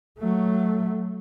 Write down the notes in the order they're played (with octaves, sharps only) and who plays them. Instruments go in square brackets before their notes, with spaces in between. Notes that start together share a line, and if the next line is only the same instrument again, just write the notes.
[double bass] F#3 A3